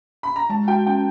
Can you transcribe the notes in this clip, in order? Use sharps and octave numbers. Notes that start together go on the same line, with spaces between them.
B5
A#5
G#3 A5
F#4 G5
C#4 G5